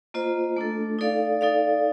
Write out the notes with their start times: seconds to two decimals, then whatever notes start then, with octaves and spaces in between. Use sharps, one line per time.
0.14 A#3 F4 C5 D#5
0.57 A3 D4 A4
0.99 D#4 A4 D5 F5
1.41 D#4 A4 D5 F5